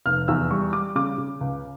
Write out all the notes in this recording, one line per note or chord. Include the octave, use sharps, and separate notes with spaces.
F1 F6
E2 E6
G3 C#6
G3 D6
C#3 D6
C#3
C#2